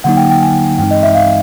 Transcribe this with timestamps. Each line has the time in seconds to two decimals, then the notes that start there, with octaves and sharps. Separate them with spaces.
0.04 D3 F#3 A#3 D#4 F#5
0.17 G5
0.30 G5
0.41 G#5
0.78 G2 E3 G#3 C4 D#4 G5
0.91 D#5
1.03 E5
1.15 F5